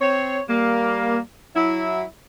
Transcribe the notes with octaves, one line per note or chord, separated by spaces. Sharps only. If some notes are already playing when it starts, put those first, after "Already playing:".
C4 C#5
G3 A#3
F#3 E4